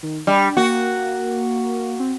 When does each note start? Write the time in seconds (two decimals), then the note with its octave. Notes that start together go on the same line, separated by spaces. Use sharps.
0.03 D#3
0.27 G3 D4
0.57 A#3 F#4
2.00 C4